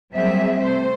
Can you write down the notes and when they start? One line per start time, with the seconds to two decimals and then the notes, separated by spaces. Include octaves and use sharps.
0.14 F#3 G3 A#3 C4 G#4 E5
0.61 C3 A3 C5